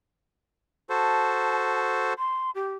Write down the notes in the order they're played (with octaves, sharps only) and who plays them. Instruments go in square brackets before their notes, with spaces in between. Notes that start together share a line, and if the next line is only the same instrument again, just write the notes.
[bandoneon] F#4 A4 C5 [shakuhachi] A5
[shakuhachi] C6
G4